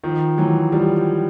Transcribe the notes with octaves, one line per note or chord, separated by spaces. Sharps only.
D#3 F3
E3 F#3
F3 G3